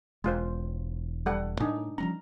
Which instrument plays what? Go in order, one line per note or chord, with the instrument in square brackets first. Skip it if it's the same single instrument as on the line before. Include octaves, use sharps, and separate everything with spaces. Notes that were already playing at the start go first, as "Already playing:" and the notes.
[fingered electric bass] E1 [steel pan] G#3 F4 C5
[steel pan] G3 A4 F#5
[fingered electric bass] A2 [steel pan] D4 D#4 G#5
[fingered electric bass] F3 G3 C#4 [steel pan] A#5